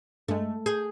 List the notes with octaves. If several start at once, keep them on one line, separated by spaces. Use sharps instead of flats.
G2 G#3 A3
G#4 G6